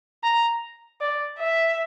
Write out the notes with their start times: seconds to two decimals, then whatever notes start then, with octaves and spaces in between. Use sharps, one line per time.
0.23 A#5
1.00 D5
1.39 E5